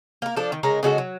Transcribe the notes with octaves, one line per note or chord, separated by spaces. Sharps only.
A#3 A#4
F3 D4 A4
D#3
C#3 G#3 D#4 A#4
C#3 G#3 F#4 A4
F#3